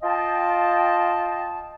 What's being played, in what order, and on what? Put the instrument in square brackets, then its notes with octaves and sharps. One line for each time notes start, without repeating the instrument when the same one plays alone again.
[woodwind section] F4 D#5 G5 A5